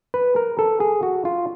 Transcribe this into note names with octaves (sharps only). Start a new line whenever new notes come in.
B4
A#4
A4
G#4
F#4
F4